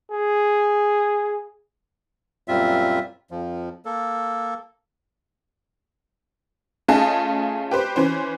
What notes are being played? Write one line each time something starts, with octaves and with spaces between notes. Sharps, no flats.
G#4
F#2 A#2 G3 C4 F4 E5
F2 F3
A#3 A4
A3 C#4 F4 G#4 D#5 A5
G4 B4 C5
E3 C#4 C5